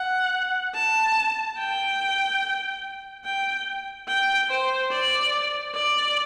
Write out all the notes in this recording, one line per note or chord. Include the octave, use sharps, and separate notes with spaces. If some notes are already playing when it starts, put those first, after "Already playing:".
Already playing: F#5
A5
G5
G5
G5
C5
D5
D5